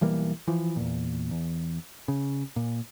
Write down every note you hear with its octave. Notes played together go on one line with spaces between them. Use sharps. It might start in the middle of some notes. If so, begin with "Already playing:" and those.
B1 E3 G3 A#3
E3 F3
E2 A#2
E2
C#3
A#2